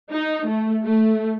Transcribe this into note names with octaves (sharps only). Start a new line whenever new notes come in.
D#4
A3
A3